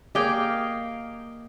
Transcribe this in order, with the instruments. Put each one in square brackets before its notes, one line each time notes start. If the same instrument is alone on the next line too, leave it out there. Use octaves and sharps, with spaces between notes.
[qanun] A#3 F5 G5 [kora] G4 G#4 [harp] D#5